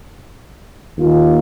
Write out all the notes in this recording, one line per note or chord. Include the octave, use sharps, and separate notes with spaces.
D#2 D#3 A#3 F4